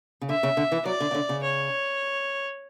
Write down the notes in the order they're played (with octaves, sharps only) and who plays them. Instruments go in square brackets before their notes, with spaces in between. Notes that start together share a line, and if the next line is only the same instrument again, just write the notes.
[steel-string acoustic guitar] C#3
[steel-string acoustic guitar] D3 [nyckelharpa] E5
[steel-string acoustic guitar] C#3
D3
E3
[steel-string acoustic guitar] F#3 [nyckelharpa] D5
[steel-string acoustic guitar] D3
C#3
D3
C#3
[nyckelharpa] C#5